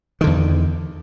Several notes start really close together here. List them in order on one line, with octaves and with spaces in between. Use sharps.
D#3 D3 E2